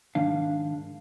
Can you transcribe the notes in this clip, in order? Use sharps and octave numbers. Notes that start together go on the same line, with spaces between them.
G#2 D#3 D4 F5